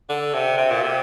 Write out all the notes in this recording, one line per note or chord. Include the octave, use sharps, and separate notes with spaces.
D3
C3
C3
A#2
C3